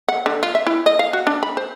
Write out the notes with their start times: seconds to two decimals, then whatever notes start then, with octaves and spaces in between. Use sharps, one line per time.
0.09 F#5
0.26 D3
0.43 F4
0.55 E5
0.67 E4
0.86 D#5
0.99 F5
1.13 F#4
1.27 D4
1.43 B5
1.57 C5